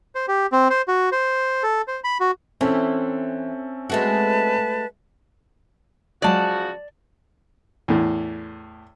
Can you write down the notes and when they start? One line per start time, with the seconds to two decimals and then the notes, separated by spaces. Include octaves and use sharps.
0.15 C5
0.28 G4
0.52 C4
0.70 C5
0.88 F#4
1.12 C5
1.63 A4
1.88 C5
2.04 B5
2.20 F#4
2.61 E3 C4 C#4 A4
3.90 G#3 A3 F#4 B4 A5
6.22 C#3 F3 F#3 G#3 F#4 D5 D#5 A5
7.88 E2 A2